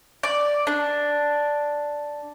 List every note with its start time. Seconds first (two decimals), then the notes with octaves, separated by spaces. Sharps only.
0.23 D5
0.67 D4